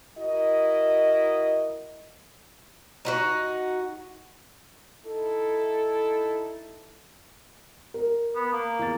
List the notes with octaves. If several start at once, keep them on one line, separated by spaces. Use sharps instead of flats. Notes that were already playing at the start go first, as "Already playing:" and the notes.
E4 F#4 A#4 D#5
D#4 F4 F#4
D#4 E4 A4
A#4
B3
A#3
E2 A6